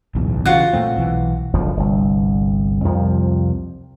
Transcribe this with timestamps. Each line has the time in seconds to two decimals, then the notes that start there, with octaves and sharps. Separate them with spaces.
0.15 D1 B1 E2
0.46 C#3 E3 F4 F#4 F#5
0.73 A#2 A3 C4
0.97 B1 E3
1.54 F#1 D2 F3
1.77 G1 C2
2.85 C2 F2 C3 F3